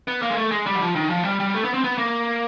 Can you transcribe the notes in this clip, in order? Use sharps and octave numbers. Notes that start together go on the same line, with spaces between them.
B3
A#3
G#3
A3
G#3
G3
F#3
F3
D#3
F3
G3
G3
A3
B3
C4
B3
A#3